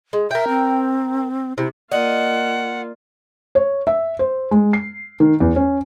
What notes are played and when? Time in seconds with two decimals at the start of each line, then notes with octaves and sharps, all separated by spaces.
0.13 G#3
0.31 A#4 E5 G5
0.48 C4
1.58 C3 E4
1.92 A#3 F4 D5 D#5 F#5
3.55 C#5
3.87 E5
4.19 C5
4.51 G#3
4.73 C7
5.20 D#3
5.40 E2
5.56 C#4